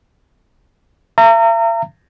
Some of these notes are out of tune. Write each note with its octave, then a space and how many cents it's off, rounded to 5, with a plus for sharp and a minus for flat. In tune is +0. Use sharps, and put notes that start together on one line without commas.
E5 +45 A#5 -30